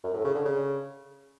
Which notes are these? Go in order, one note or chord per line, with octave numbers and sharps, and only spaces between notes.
F#2
A2
C#3
D3
C#3